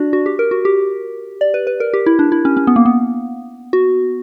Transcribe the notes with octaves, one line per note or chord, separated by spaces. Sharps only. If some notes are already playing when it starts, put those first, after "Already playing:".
Already playing: D4 F#4 D5
F#4
G4
A#4
F#4
G4
D5
B4
B4
A#4
G4
E4
D4
E4
C#4
C#4
B3
A#3
B3
F#4